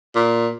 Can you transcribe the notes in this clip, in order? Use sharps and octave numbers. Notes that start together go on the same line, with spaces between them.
A#2